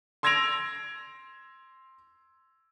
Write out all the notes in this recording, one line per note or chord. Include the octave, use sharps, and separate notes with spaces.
C6 E6 G#6 A#6 D7 F7